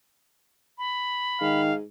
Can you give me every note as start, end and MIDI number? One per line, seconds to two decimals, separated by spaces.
0.78 1.61 83
1.41 1.83 44
1.41 1.71 51
1.41 1.75 77